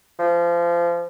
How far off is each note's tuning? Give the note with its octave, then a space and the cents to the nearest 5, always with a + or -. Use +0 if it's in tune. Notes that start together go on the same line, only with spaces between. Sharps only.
F3 -25